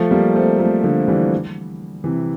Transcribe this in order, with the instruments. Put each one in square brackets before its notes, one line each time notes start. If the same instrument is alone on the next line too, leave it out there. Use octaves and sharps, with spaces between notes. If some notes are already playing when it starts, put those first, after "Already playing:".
Already playing: [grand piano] F3 A3
G3 A#3
A3 C4
F3 A3
D3 F3
E3 G3
C3 E3